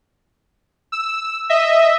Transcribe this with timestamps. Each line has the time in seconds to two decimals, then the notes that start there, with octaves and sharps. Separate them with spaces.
0.92 E6
1.49 D#5 E5